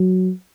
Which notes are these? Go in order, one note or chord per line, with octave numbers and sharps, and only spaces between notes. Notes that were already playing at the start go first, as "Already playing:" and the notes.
Already playing: F#3